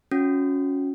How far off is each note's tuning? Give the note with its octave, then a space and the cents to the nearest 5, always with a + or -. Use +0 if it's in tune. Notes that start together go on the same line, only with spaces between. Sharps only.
C#4 +5 F#4 -30